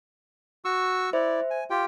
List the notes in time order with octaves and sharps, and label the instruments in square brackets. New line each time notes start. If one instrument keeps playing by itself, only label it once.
[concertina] F#4 C#6 E6
[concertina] E4 D5 [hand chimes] C5 E5
[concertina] G#5
F4 G4 G5